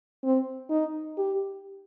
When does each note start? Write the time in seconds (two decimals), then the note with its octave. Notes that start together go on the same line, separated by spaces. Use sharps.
0.24 C4
0.70 D#4
1.18 G4